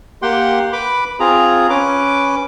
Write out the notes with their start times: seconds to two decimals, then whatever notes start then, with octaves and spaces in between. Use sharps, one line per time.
0.22 A#3 G4 F#5 G5 C6
0.73 B4 B5 D6
1.20 C4 F4 G#4 A#5
1.70 C#4 B4 D6